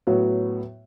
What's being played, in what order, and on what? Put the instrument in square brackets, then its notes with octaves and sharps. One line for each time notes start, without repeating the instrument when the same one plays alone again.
[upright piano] A2 F#3 B3 F#4